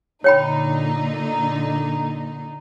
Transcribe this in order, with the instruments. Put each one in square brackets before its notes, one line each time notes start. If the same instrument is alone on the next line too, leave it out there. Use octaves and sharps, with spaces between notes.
[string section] A#2 D3 D#4 [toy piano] C#5 G5 B5